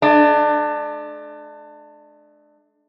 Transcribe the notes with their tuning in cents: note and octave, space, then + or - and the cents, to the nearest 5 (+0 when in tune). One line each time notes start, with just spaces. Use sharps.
A3 -45 D4 +25